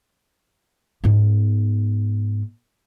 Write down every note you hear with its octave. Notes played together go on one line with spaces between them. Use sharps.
G#2 B3